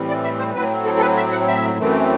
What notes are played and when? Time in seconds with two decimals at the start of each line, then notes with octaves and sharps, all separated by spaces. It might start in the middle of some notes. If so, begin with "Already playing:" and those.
Already playing: A2 E3 G3 C4
0.09 D5
0.24 E5
0.39 C5
0.55 A2 F#3 C4 B4
0.85 A4
0.97 A4
1.02 B4
1.17 E5
1.32 F#5
1.48 E5
1.79 F#2 E3 A3 C4